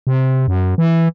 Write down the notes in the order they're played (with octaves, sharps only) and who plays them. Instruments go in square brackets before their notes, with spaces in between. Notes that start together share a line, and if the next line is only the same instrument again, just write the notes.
[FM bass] C3
F#2
E3